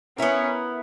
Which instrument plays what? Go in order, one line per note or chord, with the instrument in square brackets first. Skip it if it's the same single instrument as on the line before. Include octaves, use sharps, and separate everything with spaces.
[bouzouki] B3 E4 A#4 [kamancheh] C#4